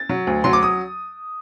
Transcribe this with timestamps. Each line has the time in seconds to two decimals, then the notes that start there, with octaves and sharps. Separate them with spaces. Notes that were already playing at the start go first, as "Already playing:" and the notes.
Already playing: A6
0.09 F#3
0.27 D2
0.44 F#3 C6
0.53 D6
0.63 D#6